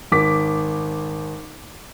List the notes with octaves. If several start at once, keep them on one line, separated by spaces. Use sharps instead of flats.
G#1 D6 B6